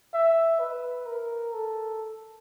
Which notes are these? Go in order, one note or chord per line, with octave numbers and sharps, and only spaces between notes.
E5
B4
A#4
A4